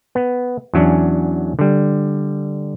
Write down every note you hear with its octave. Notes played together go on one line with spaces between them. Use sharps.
B3
E2 F#3 C#4 D4
D3 G3